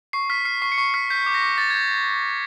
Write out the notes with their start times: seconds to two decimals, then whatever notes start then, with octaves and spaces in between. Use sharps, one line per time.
0.13 C#6 C7
0.30 F6 B6
0.45 F6 C7
0.62 C#6 C7
0.72 C#7
0.78 C#6 C7
0.94 F6 B6
1.10 G6 B6
1.26 D6
1.35 A#6
1.42 D6
1.58 D6 A6
1.70 G#6
1.74 G6